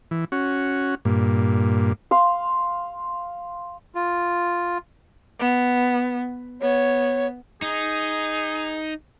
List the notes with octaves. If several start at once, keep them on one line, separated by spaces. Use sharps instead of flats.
E3
C#4 F#4
G2 A#2
F5 C6
F4
B3
B3 C#5
D#4 G#4